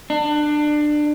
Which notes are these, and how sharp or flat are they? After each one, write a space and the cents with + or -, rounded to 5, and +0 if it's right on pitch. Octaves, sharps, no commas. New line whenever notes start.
D4 +25